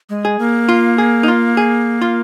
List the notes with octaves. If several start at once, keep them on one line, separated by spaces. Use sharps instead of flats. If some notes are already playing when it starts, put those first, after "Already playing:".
G#3
G#4
A#3
F4
G#4
D#4
F4
G#4
F4